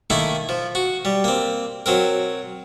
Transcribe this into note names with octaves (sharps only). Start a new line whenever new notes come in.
D#3 A3 A#3 D#4 E4
F3
F#4
G3
A#3 C4
F#3 C4 A#4